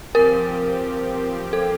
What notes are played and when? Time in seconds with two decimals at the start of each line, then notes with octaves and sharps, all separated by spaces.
0.14 F3 C4 G4 A#4
1.53 A4